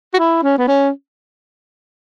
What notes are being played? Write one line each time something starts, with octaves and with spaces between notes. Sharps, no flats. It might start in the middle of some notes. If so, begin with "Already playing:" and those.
F#4
E4
C#4
B3
C#4